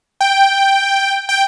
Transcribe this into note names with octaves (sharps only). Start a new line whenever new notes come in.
G5
G5